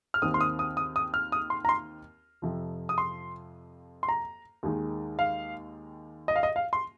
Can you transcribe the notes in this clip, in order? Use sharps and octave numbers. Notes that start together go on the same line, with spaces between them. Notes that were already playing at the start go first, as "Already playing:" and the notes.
F6
D#2 D#3 C4 D#6
C6
D#6
D#6
D#6
D#6
F6
D#6
C6
A#5
C6
F2 C3 F3
D#6
C6
C6
A#5
D#2 D#3 G#3 D#4
F5
D#5
F5
D#5
F5
C6